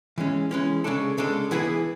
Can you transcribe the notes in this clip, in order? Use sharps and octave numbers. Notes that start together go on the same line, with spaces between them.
E3 G#3 C#4
E3 G#3 C#4
C#3 G#3 D4 A4
C#3 G#3 D4 A4
E3 B3 E4 G#4 B4